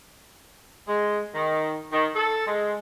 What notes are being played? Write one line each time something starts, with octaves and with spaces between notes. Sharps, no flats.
G#3
D#3
D#3
A4
G#3